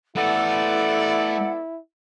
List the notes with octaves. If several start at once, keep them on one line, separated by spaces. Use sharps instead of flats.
A3 B3 E4 A4 B4 D5 F#5